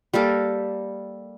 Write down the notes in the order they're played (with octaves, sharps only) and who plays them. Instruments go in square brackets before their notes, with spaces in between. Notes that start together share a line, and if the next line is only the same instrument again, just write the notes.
[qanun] G3 A#3 A4 A#4